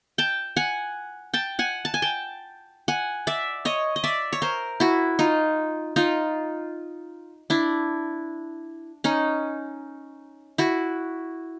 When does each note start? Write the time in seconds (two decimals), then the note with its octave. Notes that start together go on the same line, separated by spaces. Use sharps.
0.18 G5 A5
0.56 F#5 G#5
1.34 G5 A5
1.59 F#5 G#5
1.85 A5
1.94 G#5
2.02 G5 A5
2.88 F#5 G#5
3.27 D5 E5
3.65 C#5 D#5
3.96 D#5
4.04 D5 E5
4.33 C#5
4.42 A#4 C5
4.80 E4 F#4
5.19 D#4 F4
5.96 D#4 F4
7.50 D4 E4
9.04 C#4 D#4
10.58 E4 F#4